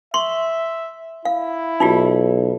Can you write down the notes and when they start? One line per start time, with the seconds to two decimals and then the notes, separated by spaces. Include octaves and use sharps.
0.14 E5 C6 C#6
1.25 E4 F5
1.80 B1 D#4 F4 G4